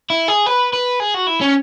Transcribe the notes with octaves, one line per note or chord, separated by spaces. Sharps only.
E4
G#4
B4
B4
G#4
F#4
E4
C#4